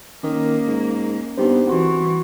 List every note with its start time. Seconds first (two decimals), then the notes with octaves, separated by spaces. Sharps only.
0.23 D#3 A#3 C#4 D6
0.67 G#2
1.37 G2 B3 D#4 G4 C5
1.67 C2 E3 F#4 F#5 C6 C#6